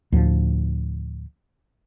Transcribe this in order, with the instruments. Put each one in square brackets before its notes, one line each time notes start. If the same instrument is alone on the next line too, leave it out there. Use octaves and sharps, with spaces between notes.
[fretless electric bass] D2 A2 F3